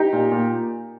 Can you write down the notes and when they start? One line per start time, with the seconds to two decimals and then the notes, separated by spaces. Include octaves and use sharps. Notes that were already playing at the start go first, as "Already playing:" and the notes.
Already playing: D#4 G4
0.13 A#2
0.31 A#2